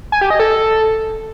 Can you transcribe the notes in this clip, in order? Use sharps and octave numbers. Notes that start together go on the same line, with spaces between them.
G#5
G4
D#5
A4